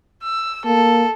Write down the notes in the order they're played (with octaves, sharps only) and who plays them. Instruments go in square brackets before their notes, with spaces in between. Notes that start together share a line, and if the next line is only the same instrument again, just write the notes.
[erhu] E6
[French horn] A#3 [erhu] A4